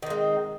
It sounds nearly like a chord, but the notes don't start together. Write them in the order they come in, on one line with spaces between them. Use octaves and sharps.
D#3 C4 G#3